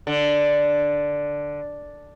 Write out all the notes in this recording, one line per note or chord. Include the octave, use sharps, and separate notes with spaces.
D3